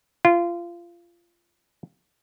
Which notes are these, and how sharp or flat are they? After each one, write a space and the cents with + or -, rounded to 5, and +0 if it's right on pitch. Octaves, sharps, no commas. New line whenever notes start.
F4 -20